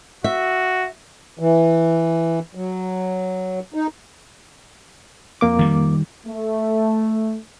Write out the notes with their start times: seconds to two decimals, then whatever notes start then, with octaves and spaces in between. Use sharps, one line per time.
0.24 F#4 E5
1.39 E3
2.55 F#3
3.74 D#4
5.41 F2 A#3 D6
5.59 D#3 G3
6.26 A3